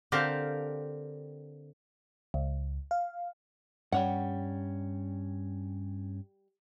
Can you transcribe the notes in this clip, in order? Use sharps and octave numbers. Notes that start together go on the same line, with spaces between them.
D3 C4 G4 A#4 F5 A5
C#2
F5
G2 G3 C#4 C#5 F#5